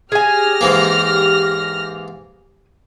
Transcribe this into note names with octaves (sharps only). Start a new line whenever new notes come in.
G4 G#4 G#5 F6 A#6
G#2 E3 A#3